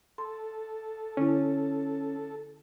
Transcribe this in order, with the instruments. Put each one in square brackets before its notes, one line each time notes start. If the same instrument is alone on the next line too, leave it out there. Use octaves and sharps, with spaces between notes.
[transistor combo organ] A4 [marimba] C6
[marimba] D3 E4 [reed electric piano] C#4